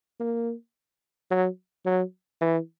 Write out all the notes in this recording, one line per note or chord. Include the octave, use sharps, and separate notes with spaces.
A#3
F#3
F#3
E3